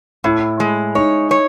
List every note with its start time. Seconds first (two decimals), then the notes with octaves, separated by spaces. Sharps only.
0.24 A2 E4
0.60 G#3
0.95 D#4 C#5
1.31 C#5